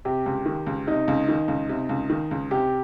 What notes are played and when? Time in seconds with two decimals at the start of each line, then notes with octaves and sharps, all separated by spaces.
0.05 C3 G4
0.26 C#2
0.46 D#3
0.66 C#2
0.87 C3 D#4
1.08 C#2
1.29 D#3
1.48 C#2
1.69 C3
1.89 C#2
2.10 D#3
2.31 C#2
2.51 C3 G4